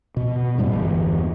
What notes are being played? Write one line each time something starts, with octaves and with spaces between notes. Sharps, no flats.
B2
F#2 A2 G3 A3
G1 E2